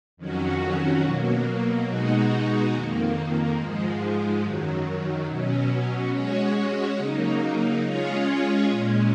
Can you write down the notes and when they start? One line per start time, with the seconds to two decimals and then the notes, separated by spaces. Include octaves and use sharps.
0.17 F2 D#3 F#3 C#4 F#4
1.02 B2 F#3 A#3
1.87 B2 G#3 D#4 F#4
2.73 F2 D#3 A#3
3.57 G#2 F3 G#3
4.42 F#2 D#3 F#3
5.27 B2 F#3 C#4
6.12 G#3 C#4 F#4 C#5
6.97 C#3 F#3 A#3 D#4
7.82 G#3 C#4 F4 G#4 C#5
8.67 A#2 G#3 C#4